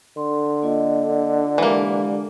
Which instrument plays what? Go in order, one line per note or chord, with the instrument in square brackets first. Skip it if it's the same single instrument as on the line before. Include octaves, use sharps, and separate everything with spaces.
[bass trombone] D3 [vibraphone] C6
[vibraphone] A#3 F4 D#5
[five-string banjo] E3 A#3 [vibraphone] G#3 G4